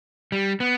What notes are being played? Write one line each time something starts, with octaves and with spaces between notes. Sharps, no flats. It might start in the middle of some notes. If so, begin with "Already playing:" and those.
G3
B3